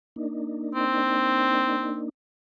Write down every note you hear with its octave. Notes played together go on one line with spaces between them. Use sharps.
A#3 D4 D#4
C4